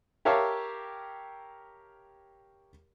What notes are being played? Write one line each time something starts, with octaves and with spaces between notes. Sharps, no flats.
G4 A#4 C#5 E5 F5 A5